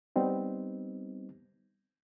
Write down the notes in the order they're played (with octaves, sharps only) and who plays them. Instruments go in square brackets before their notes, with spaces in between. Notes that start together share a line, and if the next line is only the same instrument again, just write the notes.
[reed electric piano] G3 B3 C4 D#4